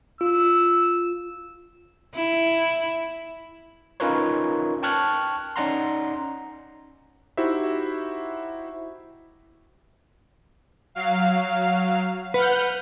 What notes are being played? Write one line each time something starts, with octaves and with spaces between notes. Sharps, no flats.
F4 E6
E4
C#4 D#4 F4 A#4 B4 C#5
G5 A5 C#6 F6 F#6 G#6
C#4 D#4 D5 F#5 A#5 C6
D#4 E4 F#4 G4 C5 E5
F#3 F5
B4 F#5 F6 G6